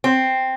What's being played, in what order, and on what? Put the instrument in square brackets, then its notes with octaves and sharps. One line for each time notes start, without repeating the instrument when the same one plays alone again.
[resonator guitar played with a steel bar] C4